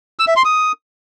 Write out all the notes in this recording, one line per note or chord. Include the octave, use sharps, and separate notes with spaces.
E6
E5
C6
D#6